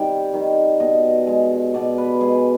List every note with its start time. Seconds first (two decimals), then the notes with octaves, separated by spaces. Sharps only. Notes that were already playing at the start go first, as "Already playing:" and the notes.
Already playing: C3 D#3 G3 G5
0.33 D#3 G3
0.80 B2 D#5
1.27 G#3
1.74 B2 D5
1.98 B4
2.21 G#3 G#4